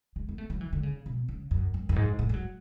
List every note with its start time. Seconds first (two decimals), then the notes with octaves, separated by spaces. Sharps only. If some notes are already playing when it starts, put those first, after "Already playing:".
0.16 G#3
0.29 B3
0.38 A3
0.50 F#3
0.61 E3
0.73 D3
0.83 C#3
1.06 B2
1.29 C#3
1.51 F#2
1.74 F#2
1.89 F#2
1.96 G#2
2.19 A2
2.29 G#3
2.34 F#3